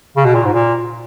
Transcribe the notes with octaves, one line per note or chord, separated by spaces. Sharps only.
C#3
B2
A#2
G#2
A#2